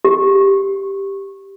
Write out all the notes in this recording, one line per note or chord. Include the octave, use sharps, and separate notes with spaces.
G4